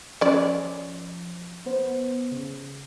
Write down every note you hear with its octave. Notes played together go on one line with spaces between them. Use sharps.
F3 C#4 D5
B3 C5
C#3